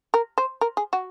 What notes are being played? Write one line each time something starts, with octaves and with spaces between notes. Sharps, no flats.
A#4
C5
A#4
G#4
F#4